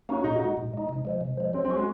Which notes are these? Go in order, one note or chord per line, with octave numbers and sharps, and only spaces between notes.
A#3 C#4 D#4 F#4
A#2 D#4
F#4
G#3 D#4
A#2
G#3 D#4
C3
F3 G#3
C3
F3 G#3
F#3 C4
C4
C#4 F#4
G#3